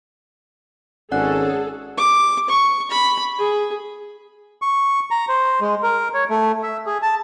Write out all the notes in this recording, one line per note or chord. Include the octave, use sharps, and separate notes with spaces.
G#1 C#4 G#4 A4 D5 F#5 F#6
D6
C#6
B5
G#4
C#6
A#5
C5
G#3
A#4
C#5
A3
E5
G#4
A5